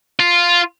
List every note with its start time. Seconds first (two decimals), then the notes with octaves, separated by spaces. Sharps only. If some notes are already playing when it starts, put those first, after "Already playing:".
0.20 F4